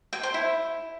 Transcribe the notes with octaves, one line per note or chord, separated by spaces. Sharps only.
G5
C5
E4